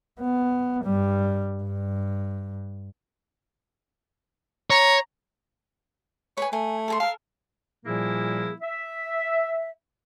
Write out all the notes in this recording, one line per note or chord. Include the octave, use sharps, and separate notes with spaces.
B3
G2 G3
G2
C#5 A#5
B4 C#5 G#5
A3 G#5
A4 A#5 C6
A4 A#4 F5
A#2 F3 G3 A#3 E4 G#4
E5